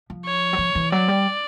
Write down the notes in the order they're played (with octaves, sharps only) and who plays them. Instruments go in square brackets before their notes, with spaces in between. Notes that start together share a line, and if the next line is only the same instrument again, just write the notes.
[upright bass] F3
[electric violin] C#5
[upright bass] F#3
F3
E3
[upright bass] F#3 [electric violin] D5
[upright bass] G3